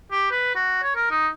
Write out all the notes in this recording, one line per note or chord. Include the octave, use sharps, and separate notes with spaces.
G4
B4
F#4
C#5
A#4
D#4